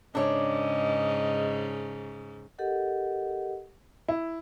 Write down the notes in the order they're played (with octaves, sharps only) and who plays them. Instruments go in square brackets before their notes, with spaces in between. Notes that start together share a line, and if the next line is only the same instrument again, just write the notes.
[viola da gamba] G#2 C#3 [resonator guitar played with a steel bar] D4 C#5 [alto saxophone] D#5
[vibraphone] G4 A4 A#4 D#5 F#5
[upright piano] E4